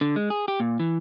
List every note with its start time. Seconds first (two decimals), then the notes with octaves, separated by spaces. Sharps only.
0.01 D3
0.16 G#3
0.30 G#4
0.48 G4
0.60 A#2
0.80 E3